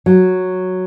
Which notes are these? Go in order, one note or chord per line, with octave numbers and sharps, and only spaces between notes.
F#3